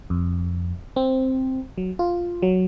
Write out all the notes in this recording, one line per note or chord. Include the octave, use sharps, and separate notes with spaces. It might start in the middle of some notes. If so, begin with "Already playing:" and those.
F2
C4
F#3
F4
F#3